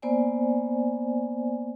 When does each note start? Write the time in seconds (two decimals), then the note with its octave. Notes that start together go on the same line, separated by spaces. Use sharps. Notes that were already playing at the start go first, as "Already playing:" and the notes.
0.02 A#3 B3 C5 D5 G#5